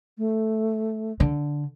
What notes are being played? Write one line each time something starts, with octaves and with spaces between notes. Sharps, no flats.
A3
D3